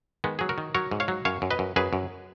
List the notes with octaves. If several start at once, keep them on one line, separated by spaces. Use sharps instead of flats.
D#3 G#3 B3
F#3 G#4
F#4 A#4
D#3
F#3 A#4 C#5
G#2
C#5 F5
F#3
F#2 C#5 F5
F#2
B4 D#5
F#2
F#2 G#4 B4
F#2